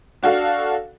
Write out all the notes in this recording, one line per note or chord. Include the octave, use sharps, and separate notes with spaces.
D4 F#4 A4 F5